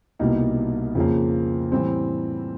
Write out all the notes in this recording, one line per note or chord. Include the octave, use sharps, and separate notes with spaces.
C2 B2 G3 A#3 D#4
F2 C#3 F3 A#3
A2 E3 G3 C4